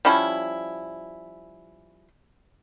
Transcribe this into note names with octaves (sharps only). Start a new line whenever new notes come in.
F3 G3 C#4 E4